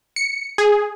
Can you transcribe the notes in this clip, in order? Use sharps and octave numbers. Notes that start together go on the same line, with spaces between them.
C#7
G#4